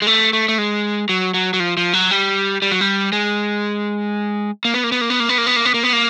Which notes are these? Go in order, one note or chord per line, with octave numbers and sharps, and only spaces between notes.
G#3
A3
A3
A3
G#3
F#3
F#3
F#3
F3
F3
F#3
G3
G3
F#3
G3
G#3
A#3
B3
A#3
B3
A#3
B3
A#3
B3
A#3
B3
A#3
B3
A#3
B3
A#3